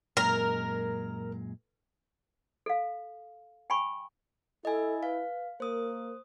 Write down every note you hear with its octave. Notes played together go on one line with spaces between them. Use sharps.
F#2 A#2 G#3 A#4
A4 F5
G5 G#5 B5 C#6
E4 A4 D#5 G#5
B4 F5
A#3 A#4 C5 D#6